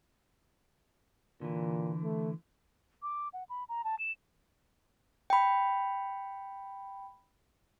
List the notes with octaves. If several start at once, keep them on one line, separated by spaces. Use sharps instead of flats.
A#2 D3 E3
A3
D6
F#5
B5
A#5
A5
E7
G5 B5